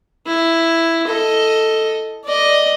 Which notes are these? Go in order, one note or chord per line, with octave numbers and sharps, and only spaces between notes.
E4
A4 D#5
D5 D#5